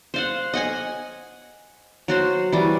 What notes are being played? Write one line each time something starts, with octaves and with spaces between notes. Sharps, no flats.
C5 F5 F#5
D#5 F#5 G#5
F#3 F#4 C5
E3 G3